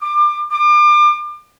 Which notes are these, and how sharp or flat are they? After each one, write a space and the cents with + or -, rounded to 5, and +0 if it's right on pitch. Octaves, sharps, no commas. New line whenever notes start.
D6 +30
D6 +35